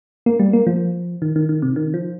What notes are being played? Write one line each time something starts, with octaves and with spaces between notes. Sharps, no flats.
A#3
G3
A#3
F3
D#3
D#3
D#3
C3
D#3
F3